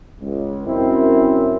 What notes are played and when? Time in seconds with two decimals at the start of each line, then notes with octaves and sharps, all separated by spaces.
0.21 C#2
0.67 F#2 C4 E4 A#4